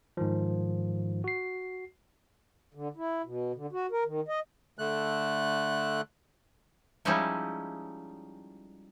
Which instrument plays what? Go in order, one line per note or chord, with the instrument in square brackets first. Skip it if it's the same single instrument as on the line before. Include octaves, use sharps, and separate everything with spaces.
[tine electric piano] G#2 D#3 F3
F#4 C7
[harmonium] D3
E4
B2
D3
F#4
A#4
D#3
D#5
[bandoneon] D3 A3 F#6
[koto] F3 G3 G#3 C#4 D#4 E4